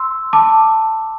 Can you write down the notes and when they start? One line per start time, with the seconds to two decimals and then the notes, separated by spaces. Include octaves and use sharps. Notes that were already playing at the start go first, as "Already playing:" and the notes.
Already playing: C6 E6
0.33 A5 D6